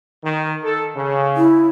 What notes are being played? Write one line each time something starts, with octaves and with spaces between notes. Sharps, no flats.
D#3
A4
C#3
E4